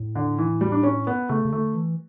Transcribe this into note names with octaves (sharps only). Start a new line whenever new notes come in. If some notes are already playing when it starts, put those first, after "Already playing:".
Already playing: A2
D3
E3
G3
D4
C#4
B3
C#3 A3
C#3
D3 A3
E3